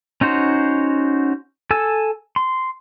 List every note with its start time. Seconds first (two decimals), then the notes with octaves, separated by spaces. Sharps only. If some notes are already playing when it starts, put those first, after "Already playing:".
0.21 C#4 D#4 F#4 C5
1.71 A4 G#5 E6
2.36 C6